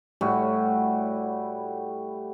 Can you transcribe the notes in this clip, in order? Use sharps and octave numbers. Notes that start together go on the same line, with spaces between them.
A2 G3 F#4